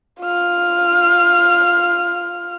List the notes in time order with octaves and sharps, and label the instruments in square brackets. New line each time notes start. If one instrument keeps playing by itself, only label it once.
[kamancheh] F4 F6